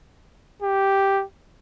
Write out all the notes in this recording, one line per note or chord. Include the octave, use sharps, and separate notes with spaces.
G4